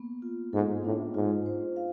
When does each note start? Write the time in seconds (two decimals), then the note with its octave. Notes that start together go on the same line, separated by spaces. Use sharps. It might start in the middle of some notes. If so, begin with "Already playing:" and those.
Already playing: A#3 B3
0.22 F4
0.53 G#2 A4
0.84 A2 D4
1.14 G#2 F4
1.46 C5
1.76 F5